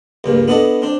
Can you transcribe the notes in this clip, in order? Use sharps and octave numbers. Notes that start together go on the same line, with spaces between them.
C#2 G2 A#2
B3 D4 E4 A4 D#5
C4 D4